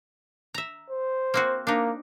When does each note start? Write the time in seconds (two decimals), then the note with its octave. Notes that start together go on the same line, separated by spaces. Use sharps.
0.54 E5 A#5
0.90 C5
1.34 A#3 C4 F#4
1.67 A#3 D4 D#4